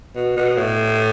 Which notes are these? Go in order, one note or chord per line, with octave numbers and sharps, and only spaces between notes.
B2
B2
A2